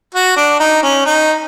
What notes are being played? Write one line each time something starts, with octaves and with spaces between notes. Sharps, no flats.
F#4
D4
D#4
C#4
D#4